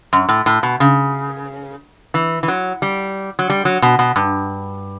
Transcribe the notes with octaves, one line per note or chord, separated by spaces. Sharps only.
F#2
A2
A2
B2
C#3
E3
E3
F#3
G3
F#3
G3
F#3
B2
B2
G2